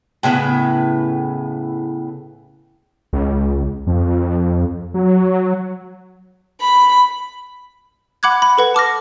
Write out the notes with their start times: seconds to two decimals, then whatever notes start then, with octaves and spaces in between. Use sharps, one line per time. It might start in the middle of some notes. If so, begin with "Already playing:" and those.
0.23 A2 C#3 B3 B4
3.13 C#2
3.87 F2
4.94 F#3
6.61 B5
8.23 F#5 B5 D6 F#6 G#6
8.42 B5
8.58 A4 B4 F#5
8.74 A5 D6 F6 A#6